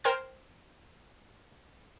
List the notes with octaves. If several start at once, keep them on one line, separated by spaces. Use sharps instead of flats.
A#4 C5 G5 C6 F6 G#6